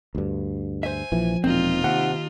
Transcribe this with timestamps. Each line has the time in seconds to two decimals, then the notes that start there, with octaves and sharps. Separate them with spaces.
0.15 D2 G2
0.83 C5 E5 G#5
1.12 A#1 E3 F3
1.44 E1 A#2 C4 D#4 F4
1.84 D#2 C3 F#5